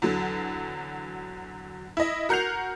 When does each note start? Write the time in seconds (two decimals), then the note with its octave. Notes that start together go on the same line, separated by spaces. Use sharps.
0.02 E2 D3 F#3
1.97 E4 D#5
2.29 F#4 A#4 F#5 G6 C7 F7